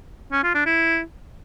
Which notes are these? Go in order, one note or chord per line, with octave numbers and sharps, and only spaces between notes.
C#4
F4
D4
E4